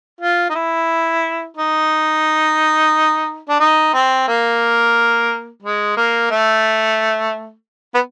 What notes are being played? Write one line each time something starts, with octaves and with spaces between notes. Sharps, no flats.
F4
D#4
E4
D#4
D4
D#4
C4
A#3
G#3
A#3
A3
B3